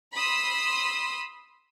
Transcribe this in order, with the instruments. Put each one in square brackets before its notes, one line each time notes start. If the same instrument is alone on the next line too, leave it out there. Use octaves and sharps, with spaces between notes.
[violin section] B5 C6 D#6 E6